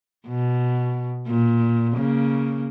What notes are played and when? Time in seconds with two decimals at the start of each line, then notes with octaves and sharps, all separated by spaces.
0.28 B2
1.27 A#2
1.94 C#3 A#3